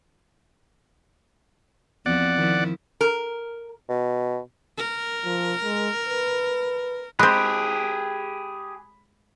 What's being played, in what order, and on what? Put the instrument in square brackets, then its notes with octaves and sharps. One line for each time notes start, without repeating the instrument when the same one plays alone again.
[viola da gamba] E2 F3 C4 [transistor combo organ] D5 F#5
[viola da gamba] D#3 F3 E4
[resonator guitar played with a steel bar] A#4
[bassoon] B2
[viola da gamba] A#4
[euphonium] F3
G#3
B4
[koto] G#3 C4 [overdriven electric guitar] G4 G#4 [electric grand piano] B5 [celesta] F#6